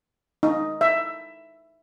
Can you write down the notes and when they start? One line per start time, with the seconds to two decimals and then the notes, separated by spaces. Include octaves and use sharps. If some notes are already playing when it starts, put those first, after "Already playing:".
0.43 D#4
0.81 E5